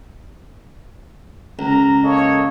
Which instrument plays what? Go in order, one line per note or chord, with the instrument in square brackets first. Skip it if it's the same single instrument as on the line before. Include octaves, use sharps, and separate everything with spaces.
[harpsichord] C#2 [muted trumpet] A#5
[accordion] A#3 A4 D#5 [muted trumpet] C#5